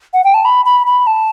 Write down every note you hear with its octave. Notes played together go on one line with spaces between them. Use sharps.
F#5
G5
A5
B5
B5
B5
A5